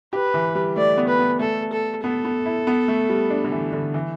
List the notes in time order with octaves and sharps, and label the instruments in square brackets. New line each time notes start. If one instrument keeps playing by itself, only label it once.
[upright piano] G4 [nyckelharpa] B4
[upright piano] E3
G3
[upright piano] A3 [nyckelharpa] D5
[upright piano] B3
[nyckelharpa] B4
[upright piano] B3
[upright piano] A3 [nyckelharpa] A4
[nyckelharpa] A4
[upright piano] B3 [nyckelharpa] A4
[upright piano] B3
E4
B3
A3
G3
D4
D3
E3
D3
E3